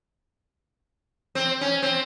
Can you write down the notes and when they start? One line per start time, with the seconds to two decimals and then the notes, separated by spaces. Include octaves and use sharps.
1.35 C4
1.61 C#4
1.82 C4